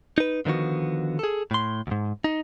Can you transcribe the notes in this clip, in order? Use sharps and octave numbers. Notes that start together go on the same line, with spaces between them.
D#4 B4
D3 D#3 F3 B3 F#4
G#4 A4
A2 C6
D2 G#2
D#4